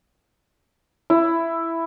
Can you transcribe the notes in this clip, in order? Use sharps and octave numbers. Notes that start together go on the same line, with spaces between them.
E4